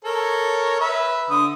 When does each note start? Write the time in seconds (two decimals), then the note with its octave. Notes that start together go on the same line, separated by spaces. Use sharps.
0.05 A4 A#4 C#5
0.80 B4 E5
1.30 D3 D#6